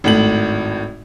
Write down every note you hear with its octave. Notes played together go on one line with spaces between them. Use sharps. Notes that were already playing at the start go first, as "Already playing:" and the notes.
G#1 A2 F#7